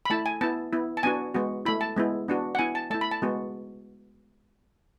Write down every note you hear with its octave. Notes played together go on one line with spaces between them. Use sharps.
B5
A3 E4 A5
G#5
B3 E4 A5
B3 E4
A5
B3 D4 F#4 G#5
G#3 B3 F#4
A3 E4 B5
A5
G#3 B3 E4
B3 D4 F#4
F#5
B3 E4 G#5
A5
A3 E4 A5
B5
A5
G#3 B3 F#4